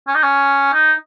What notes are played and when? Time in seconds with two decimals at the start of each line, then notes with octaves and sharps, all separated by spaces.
0.07 C#4
0.15 D#4
0.23 C#4
0.73 D#4